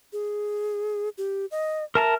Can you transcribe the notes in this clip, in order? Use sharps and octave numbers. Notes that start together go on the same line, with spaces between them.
G#4
G4
D#5
A#4 E5 A5 A#5